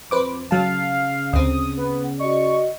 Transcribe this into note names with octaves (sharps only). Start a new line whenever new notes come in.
F2 B4 C5 D6
C#3 F#3 F5 A5
D2 C4 D#6
B3
F#4 D5 D#5 C#6